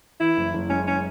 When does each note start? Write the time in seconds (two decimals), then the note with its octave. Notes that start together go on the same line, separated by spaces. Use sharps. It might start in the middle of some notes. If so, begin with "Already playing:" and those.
0.20 E3 E4
0.37 F#1
0.54 F#1
0.70 G#3 C#4
0.87 C#4